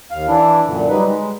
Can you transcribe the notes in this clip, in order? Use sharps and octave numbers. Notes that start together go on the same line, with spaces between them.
D#2 F5
E3 D4 E4
F#2 A#2 D3
F#3 G3 D#4 B4
G#3